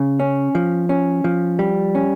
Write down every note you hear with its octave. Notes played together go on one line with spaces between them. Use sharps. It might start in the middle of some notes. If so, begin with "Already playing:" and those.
Already playing: C#3
C#4
F3
C#4
F3
G3
C#4